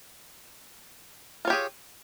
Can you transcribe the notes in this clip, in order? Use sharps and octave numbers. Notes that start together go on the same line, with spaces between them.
F4 G4 G#4 C#5